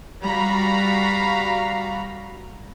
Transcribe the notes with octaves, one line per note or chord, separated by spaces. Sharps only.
G3 F#4 F5 A#5 B5